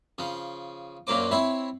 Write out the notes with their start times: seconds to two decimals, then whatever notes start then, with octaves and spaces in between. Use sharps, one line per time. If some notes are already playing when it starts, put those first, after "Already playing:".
0.18 C#3 F3
1.07 F#2 A#2 F#3 A#3 C5 D6
1.31 C4 E4 C#5 B5 C6